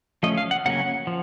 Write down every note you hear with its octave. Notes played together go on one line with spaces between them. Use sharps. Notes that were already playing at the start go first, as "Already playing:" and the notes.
F3 A3 C#4 D#5
F5
F#5
C#3 F#3 A#3 C#4 F#5
F3